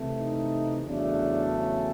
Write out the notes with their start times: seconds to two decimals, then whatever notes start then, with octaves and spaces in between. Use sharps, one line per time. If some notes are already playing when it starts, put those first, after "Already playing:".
Already playing: C3 E3 A3
0.17 D#4
0.84 E2 C#3 F#3 A3 D4
1.52 C#4